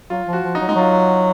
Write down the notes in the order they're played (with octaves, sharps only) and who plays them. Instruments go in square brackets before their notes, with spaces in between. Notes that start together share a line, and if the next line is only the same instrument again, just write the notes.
[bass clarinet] F#3 [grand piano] F4
[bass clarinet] F3
[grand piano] F#4
[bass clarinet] F3
[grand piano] D#4
[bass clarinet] F#3
[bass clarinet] G#3 [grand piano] D#4
[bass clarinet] F#3 [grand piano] F4